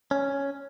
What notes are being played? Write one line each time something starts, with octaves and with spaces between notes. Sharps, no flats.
C#4